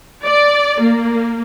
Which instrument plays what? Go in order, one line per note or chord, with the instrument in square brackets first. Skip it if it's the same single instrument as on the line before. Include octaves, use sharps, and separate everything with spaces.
[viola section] D5
A#3